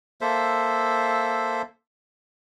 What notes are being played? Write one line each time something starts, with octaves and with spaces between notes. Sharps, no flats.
A#3 A4 C5 E5